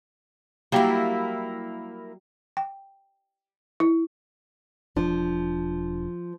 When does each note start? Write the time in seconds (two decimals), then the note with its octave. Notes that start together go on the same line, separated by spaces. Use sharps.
0.72 F#3 G3 A#3 E4 G4
2.57 G5
3.80 E4
4.96 E1 F3 D4